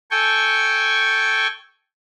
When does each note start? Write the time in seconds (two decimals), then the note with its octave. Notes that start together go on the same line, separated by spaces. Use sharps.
0.11 A4 G5 G#5 C#6